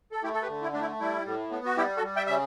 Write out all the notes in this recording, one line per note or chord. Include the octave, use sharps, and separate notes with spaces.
A4
A3 E4 G4
A4
G4 B4
D3
E4
A3 D4
E4
G3 E4
A2
B3
F#4
G3 E4 G4
F#4 A4
G3
E5 G5
C#3 E5